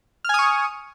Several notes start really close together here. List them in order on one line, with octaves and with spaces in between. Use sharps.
F6 G#5 D#6 C#6